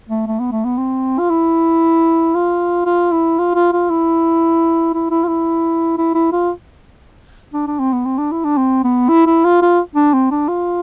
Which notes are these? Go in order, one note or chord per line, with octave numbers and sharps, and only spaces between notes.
A3
A3
B3
A3
B3
C4
F4
E4
F4
F4
E4
F4
F4
F4
E4
E4
E4
F4
E4
E4
E4
F4
D4
D4
C4
B3
C4
D4
E4
D4
C4
B3
E4
E4
F4
F4
D4
C4
D4
F4